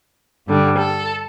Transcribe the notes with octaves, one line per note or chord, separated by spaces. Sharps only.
G2 D3 G3
A4